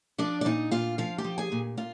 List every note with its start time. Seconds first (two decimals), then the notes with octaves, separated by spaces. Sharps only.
0.18 F3 D4 D5
0.41 D5
0.45 A#2 D#4 D#5
0.71 A#2 F4 F5
0.98 F3 F4 F5
1.18 G4 G5
1.24 F3
1.38 G#4 G#5
1.52 A#2
1.77 A#2 F4 F5